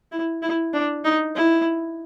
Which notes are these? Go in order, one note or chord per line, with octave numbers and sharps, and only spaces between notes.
E4
E4
D4
D#4
E4